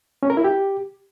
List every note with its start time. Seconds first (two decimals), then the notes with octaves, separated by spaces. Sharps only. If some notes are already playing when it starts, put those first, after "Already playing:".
0.23 C#4
0.30 A#4
0.37 E4
0.44 G4